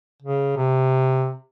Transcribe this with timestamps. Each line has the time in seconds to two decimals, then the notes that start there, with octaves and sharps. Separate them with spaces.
0.22 C#3
0.57 C3